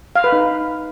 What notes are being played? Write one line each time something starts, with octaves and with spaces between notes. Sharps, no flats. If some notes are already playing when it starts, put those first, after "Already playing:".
F5
B4
D#4